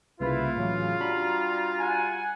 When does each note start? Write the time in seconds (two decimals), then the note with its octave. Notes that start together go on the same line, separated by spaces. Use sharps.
0.20 C2 C#3 A#3 E4 F4 B4
0.56 A2 C#3 E3 F#3
1.00 G3 D4 F#4 A#5 B5
1.80 F#5 G#5